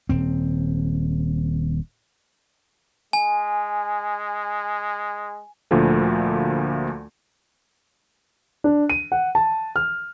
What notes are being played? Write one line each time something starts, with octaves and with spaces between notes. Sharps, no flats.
D#1 C4
G#3 G#5
D2 A#2 D3 F3 A3 A#3
D4
D#7
F#5
A5
F6